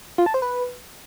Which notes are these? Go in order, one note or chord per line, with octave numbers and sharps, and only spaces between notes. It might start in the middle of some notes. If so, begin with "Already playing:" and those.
F4
A5
C5
B4